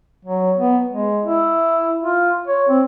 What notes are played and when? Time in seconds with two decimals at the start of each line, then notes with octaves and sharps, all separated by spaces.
0.25 F#3
0.57 B3
0.90 G#3
1.25 E4
2.03 F4
2.47 C#5
2.69 C4